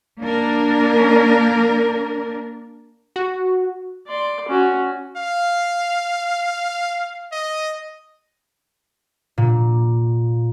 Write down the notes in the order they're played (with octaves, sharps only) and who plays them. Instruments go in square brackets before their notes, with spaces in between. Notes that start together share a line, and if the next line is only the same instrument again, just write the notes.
[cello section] A#3 D4 A#4
[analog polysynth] F#4
[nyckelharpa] D5 C6
C#4 F#4
[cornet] F5
D#5
[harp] A#2